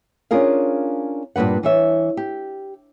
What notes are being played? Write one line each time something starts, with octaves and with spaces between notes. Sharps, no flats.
C#4 D4 F4 G#4 A#4 F5
G2 A#2 E3 B4 F#5
E3 C#5 E5
G4